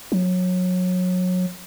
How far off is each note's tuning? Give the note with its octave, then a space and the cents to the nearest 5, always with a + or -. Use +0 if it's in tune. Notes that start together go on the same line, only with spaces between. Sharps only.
F#3 -25